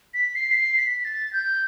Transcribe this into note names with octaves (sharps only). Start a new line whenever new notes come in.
B6
C7
B6
C7
B6
A6
G6